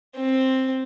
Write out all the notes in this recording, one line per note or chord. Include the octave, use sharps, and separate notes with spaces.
C4